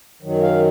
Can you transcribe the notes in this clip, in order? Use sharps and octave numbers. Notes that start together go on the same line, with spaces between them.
F#2 D#3 F#3
F5